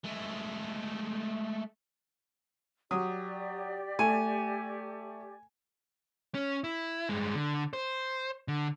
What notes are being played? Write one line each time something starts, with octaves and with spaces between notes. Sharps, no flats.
G#3 A3
F#3 G4 D5 D#6
A3 G#5
C#4
E4
G2 G#3
D3
C5
D3